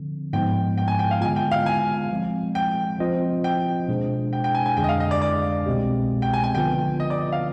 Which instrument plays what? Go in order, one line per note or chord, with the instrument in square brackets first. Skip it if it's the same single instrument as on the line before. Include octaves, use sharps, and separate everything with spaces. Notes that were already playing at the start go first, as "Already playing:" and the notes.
Already playing: [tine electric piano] D3 F3 C4
[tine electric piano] G#2 F3 G#3 B3 [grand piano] G5
[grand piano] G5
G#5
G5
F5
[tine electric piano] D3 G#3 B3 F4 [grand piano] G#5
[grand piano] G5
F5
G#5
[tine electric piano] F3 G#3 C4
[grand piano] G5
[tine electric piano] F3 C4 F4 C5 D#5
[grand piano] G5
[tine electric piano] B2 G#3 D4 G#4 C5
[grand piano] G5
G5
G#5
G#5
[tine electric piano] F2 D3 G#3 D4 G#4 [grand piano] G5
[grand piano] D#5
F5
D#5
D5
D5
[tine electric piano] C2 B2 G#3 C4 G4
[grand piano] G5
G#5
G#5
[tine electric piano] D3 F3 B3 F4 B4 [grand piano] G5
[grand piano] D#5
D5
D#5
F5